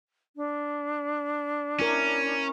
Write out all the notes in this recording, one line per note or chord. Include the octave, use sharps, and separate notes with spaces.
D4
C#4 E4 A#4